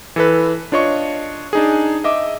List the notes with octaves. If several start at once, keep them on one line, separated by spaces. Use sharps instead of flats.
E3 A4 B4
D4 F4 C#5 D#5 C#6
D4 D#4 G#4
D#5 E5 D6